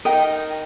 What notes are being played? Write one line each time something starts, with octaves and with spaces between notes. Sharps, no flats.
D#4 G4 A#4 D#5 G5